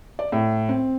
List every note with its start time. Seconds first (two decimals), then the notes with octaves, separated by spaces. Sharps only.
0.19 D5
0.32 A2
0.69 C4